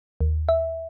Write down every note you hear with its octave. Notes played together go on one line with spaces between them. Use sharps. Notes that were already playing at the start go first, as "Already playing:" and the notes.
D#2
E5